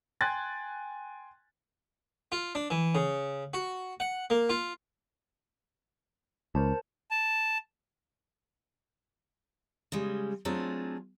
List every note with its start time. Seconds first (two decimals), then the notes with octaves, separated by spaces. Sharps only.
0.21 G5 G#5 C6 F#6 G#6 A6
2.32 F4
2.55 D4
2.70 E3
2.95 C#3
3.54 F#4
4.00 F#5
4.30 A#3
4.49 F4
6.55 C#2 A#4 C5 A5
7.11 A5
9.92 C#3 G3 G#3
10.45 F#3 A3 C4 D4 F4 G#4